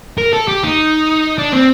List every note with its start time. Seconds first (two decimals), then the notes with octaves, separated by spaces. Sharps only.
0.18 A#4
0.33 A4
0.48 G4
0.64 D#4
1.38 D4
1.53 C4